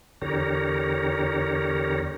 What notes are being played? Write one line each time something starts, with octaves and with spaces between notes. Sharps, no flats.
E2 D3 G4 A#4 C#5 A#5